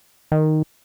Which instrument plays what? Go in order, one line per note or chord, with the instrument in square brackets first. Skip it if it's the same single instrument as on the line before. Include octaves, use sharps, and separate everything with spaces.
[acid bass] D#3